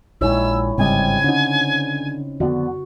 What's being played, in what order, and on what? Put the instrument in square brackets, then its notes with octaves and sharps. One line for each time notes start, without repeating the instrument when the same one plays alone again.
[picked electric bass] A#1 G#3 [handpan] D#4 E4 C#5 [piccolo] E6
[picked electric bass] G1 G3 [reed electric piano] G#2 D#5 [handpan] C#3 C4 [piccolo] G#5
[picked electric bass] D3 [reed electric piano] C#4 D#4
[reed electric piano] F2 [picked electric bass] D3 B3 [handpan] F#4